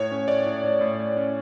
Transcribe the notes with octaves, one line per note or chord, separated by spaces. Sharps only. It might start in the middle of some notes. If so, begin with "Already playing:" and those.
Already playing: A2 C#5
C#4
A2 D5
A2
A2
A2
A2
C#4